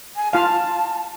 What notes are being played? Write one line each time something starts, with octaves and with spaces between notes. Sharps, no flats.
G#5
F4 F5 A5